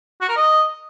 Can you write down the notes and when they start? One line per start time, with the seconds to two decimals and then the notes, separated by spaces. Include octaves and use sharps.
0.21 F#4
0.29 A#4
0.36 D#5